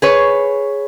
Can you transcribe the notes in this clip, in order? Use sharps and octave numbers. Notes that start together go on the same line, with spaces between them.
G#4 B4 C#5